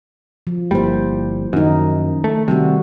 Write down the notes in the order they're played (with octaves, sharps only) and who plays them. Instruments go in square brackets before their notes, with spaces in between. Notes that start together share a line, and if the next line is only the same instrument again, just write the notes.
[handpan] F3
[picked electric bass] G1 G3 [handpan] A#3 E4 C5
[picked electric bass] F#2 [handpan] D#3 D#4
[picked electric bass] A3
[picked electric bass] C3 [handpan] D#3 G3 F#4